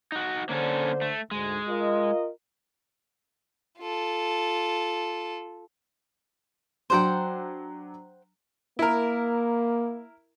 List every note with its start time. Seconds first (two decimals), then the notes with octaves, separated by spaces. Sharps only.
0.12 D#4 F#4
0.49 D3 A#3 C#4 A4 C5
1.01 A3
1.31 D2 G#2 G#3
1.68 F4 A#4 D#5
3.79 F4 A4
6.90 F#3 D4 C5 F#5 G5
8.79 A#3 E4 A#4